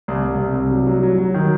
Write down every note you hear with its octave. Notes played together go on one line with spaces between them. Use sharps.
C2
C2
C3
C2
F#3
F#3
F#3
F#3
D#3